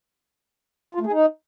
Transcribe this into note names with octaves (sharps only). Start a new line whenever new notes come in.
F4
A3
G#4
D#4